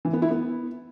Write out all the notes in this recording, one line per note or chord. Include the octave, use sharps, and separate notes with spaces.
E3
B3
E4
B3